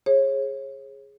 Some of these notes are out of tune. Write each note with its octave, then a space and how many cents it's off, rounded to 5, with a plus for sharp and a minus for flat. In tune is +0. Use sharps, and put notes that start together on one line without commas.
G#4 +0 C#5 -35